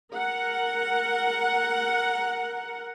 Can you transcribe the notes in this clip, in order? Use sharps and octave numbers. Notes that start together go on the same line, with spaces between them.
A#4 F#5